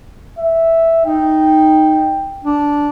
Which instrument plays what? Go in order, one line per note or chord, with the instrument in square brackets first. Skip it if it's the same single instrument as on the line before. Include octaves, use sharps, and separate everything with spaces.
[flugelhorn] E5
[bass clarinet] D#4 [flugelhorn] G5
[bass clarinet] D4